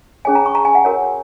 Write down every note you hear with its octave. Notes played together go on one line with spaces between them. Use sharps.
C#4 G#4 C#5 G#5
A#5
C#6
A#5
G#5
F#5
F#4 A#4 C#5